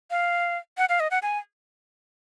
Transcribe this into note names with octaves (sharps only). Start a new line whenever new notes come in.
F5
F#5
F5
D#5
F#5
G#5